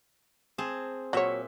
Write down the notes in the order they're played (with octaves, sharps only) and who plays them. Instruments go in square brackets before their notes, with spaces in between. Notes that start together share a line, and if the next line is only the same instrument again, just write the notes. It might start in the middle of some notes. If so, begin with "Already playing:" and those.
[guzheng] C4 G#4 A5
[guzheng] A#2 E5 [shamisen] F#3 C#5